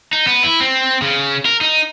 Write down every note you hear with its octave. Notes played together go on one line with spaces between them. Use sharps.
D#4
B3
E4
C4
C#3
A#4
D#4